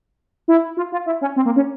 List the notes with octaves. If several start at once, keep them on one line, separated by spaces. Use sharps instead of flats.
E4
F4
F4
E4
C#4
C4
A#3
C#4